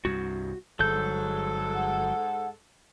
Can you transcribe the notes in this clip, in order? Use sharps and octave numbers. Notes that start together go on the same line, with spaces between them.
C2 G2 F#4
G1 G#2 F#3 G#3 A4 G6
F#5